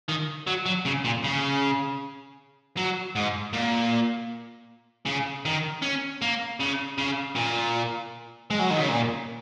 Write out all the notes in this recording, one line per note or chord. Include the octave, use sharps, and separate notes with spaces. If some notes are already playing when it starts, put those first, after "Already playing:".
D#3
F#3
F#3
C#3
A#2
C#3
F#3
G#2
A#2
C#3
D#3
C#4
A#3
C#3
C#3
A#2
G#3
F#3
D#3
C#3
A#2